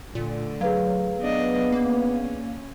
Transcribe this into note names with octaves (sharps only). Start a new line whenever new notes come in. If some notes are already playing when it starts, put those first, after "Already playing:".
A#2 D3 A3
F#3 G#4 B4 F5
B3 D4 D#5
A#3 C#4